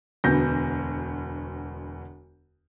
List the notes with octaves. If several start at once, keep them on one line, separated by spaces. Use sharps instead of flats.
E1 D2 B3 F#4 G6 A#6